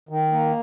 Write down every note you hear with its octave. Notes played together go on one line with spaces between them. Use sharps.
D#3
A#3